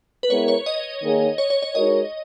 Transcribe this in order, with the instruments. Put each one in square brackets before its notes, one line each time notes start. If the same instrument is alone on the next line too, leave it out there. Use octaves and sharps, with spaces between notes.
[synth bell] B4
[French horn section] G#3 B3 E4 A#4 [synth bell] C#5
[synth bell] C#5
D#5
[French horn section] D#3 A#3 D#4 G#4 C#5
[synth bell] C#5
C#5
C#5
[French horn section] G#3 D#4 F#4 A#4 C#5 [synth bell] D#5